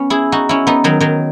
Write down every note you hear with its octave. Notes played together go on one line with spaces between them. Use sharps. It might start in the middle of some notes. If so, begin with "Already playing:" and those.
Already playing: B3 C#4
E4 G#4
D#4 F#4
C#4 E4
B3 D#4
D#3 F#3
D#3 F#3